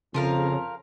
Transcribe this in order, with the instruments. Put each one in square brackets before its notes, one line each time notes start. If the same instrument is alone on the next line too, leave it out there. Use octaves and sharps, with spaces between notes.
[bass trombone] F2 [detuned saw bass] C#3 [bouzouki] F3 A#4 F5